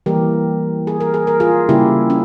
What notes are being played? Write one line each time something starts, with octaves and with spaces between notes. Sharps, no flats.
E3 G3 A#3 G4 A#4
G#4
A#4
G#4
A#4
F4 G#4
C#3 G3 A#3 E4 G4
C#4